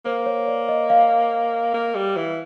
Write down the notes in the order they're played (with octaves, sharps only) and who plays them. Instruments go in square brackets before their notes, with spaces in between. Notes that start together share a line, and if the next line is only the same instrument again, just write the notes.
[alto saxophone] A#3 [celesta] C5
[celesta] C#5
D5
D#5
F5
[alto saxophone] A#3
G3
E3